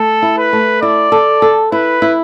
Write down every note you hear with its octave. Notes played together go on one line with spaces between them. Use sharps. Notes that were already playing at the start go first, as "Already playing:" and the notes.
Already playing: A3 A4
E4
B4
A3
E4 D5
A4
A4
E4 B4
E4